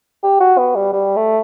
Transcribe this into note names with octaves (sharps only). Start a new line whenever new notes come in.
G4
F#4
B3
G3
G3
A3